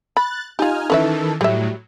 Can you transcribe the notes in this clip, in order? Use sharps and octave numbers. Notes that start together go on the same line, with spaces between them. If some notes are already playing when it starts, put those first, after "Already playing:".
B5 F#6 A6
D#4 F4 G4 G#5 F6
D#3 E3 C#4 A4 B4 E5
A2 F#3 G3 E5